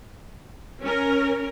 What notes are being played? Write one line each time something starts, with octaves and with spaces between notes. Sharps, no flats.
C#4 A#4